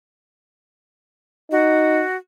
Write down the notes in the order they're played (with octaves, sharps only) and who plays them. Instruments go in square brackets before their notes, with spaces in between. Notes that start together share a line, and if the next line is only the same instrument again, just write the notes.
[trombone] D#4 [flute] F#4